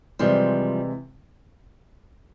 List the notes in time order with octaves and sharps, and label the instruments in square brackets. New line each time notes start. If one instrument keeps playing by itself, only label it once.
[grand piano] C3 E3 G#3 [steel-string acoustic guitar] F3 G3